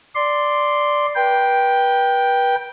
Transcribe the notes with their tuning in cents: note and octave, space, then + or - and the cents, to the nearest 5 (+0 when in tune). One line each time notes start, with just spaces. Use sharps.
D5 +0 C6 -5
B4 -35 G5 +0